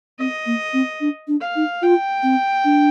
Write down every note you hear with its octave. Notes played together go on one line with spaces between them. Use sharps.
C4 D#5
A#3
C4
D4
D4
F5
D#4
F4 G5
C4
D4